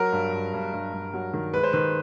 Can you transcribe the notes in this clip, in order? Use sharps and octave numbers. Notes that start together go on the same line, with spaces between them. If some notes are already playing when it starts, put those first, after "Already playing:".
Already playing: F#3 A#4
G2
G2
G2
G2
G2
F#3
D#3
G#3 B4
C5
D#3 B4